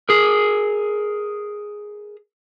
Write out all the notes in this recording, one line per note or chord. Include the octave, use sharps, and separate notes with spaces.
G#4 A#4